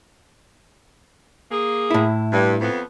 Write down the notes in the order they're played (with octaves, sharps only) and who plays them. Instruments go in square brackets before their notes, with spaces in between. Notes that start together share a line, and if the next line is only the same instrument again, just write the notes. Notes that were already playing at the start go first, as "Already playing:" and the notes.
[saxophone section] A#3 G#4
[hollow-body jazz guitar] A2 E4
[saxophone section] G2
F2 B3